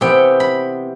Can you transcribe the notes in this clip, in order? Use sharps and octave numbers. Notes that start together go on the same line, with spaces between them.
C3 E3 B3 G5
B5